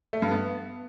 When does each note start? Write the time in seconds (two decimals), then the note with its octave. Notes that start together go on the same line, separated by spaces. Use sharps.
0.13 A3
0.22 G2
0.31 B3